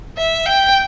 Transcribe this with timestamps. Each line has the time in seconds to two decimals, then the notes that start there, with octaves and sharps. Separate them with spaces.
0.17 E5
0.46 G5